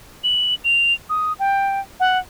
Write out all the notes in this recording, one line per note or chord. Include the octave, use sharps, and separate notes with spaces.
F#7
F7
D#6
G5
F#5